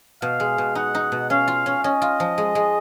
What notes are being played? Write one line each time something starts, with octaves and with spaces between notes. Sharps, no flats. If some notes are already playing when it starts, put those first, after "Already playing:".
B2 F5
G#3
B2
D#4 F#5
D#4
B2
C#4 F5
F4
C#4
C#4 D#5
F4
F3
G#3
G#3